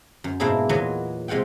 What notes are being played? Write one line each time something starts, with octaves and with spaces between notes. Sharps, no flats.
F#2
G#2 B2 A#3 D4 E4 G#4
E2 A#2 F#3 B3 D#5 G#5
C3 G#3 F4 F#5 G5